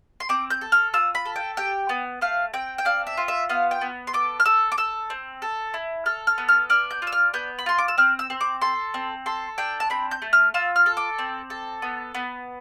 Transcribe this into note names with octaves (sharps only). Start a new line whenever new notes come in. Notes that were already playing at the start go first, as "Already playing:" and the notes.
C6
C4 D6
G6
A4
F6
F4 E6
B5
A4
G5
G4 G5
B3
A3 F5
C4 G5
G5
D4 F5
E5
F4
E5
B3 F5
G5
B3
C6
A4 D6
F6
A4 E6
D6
A4 E6
C4
A4
E4
A4 F6
F6
B3
F6
D4 F6
G6
F4
E6
F6
B3 G6
B5
F4 C6
D6
E6
C4 F6
E6
C4
D6
A4 C6
C4
A4 C6
D4 G5
A5
C4 B5
G6
A3
F6
F4 E6
F6
A4
D6
C4
A4
B3
B3